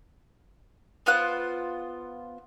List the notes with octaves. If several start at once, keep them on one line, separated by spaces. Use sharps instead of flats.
B3 F4 C5 F#6